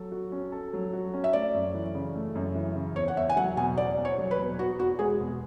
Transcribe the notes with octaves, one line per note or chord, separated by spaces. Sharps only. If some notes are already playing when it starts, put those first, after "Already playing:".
Already playing: F#3 A4
F#4
C#4
A4
F#3
F#4
C#4
E5
A3 D5
F#2
E3
C#3
A3
F#2
E3
C#3
E2 C#5
F#5
E2 E5
G#5
F#3 F#5
B2 G#5
E2 D5
E2
C#5
F#3
B4
B2
B3 F#4
E2 F#4
G#3 G#4
B2